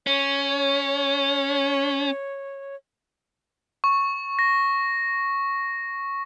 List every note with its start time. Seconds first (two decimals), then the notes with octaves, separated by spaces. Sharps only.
0.07 C#4 C#5
3.84 C#6
4.39 A#6